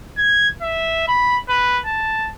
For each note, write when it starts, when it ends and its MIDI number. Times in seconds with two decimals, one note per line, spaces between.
0.17 0.48 92
0.62 1.07 76
1.08 1.38 83
1.49 1.79 71
1.86 2.30 81